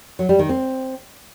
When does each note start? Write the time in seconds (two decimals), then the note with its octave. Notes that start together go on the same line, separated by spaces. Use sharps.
0.19 F#3
0.29 G3
0.39 D#3
0.49 C4